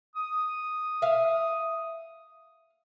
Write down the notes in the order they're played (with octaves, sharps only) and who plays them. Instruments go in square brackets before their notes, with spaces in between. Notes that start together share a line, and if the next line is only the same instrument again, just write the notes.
[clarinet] D#6
[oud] E5 F5